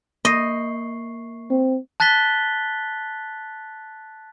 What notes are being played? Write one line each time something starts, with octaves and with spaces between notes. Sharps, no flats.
A#3 D#5 C#6 C7
C4
A5 F#6 A6 B6 G7